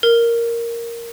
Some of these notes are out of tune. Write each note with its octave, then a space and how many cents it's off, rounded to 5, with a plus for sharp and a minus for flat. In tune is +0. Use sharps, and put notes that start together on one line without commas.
A#4 +0